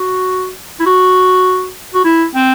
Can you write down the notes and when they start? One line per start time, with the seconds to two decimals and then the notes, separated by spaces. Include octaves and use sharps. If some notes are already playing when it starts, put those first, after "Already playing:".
Already playing: F#4
0.80 E4
0.86 F#4
1.94 F#4
2.04 E4
2.35 C4